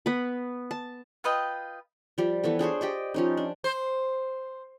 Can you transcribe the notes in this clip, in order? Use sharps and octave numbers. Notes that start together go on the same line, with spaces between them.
B3 B4
A5
F4 B4 D#5 G5
F3 G3
E3 B3 A4
D4 G#4 C5 C#5
G4 D5 D#5
F3 C#4 D#4
D4
C5